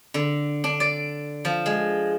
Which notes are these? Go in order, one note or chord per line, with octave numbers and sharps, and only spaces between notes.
D3
D4
D5
F3
G#3